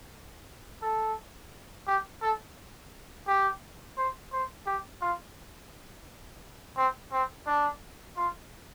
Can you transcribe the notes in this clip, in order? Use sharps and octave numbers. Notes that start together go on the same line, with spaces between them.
A4
G4
A4
G4
C5
C5
G4
F4
C4
C4
D4
F4